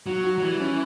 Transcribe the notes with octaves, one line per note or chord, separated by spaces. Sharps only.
F#3 F#4
F#4
F#3
E3 G3
C#4